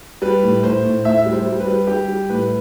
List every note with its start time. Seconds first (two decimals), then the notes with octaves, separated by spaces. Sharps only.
0.22 G3 B4
0.43 A2
0.63 A2 C5
0.84 A2
1.05 A2 E5
1.26 G3
1.33 C5
1.47 G3
1.60 B4
1.67 G3
1.87 G3 G4
2.08 G3
2.29 A2 B4